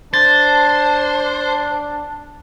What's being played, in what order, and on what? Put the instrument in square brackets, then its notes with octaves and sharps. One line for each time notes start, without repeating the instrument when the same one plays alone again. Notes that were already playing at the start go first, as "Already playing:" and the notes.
[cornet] D4 [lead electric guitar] C5 [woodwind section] A5 [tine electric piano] A6